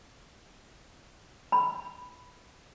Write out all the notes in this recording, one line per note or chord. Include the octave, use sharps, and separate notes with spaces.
B5